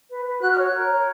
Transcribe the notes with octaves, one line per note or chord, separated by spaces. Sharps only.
B4
B4
F#4 F#6
F6
C#5
F#6
A#4
C#5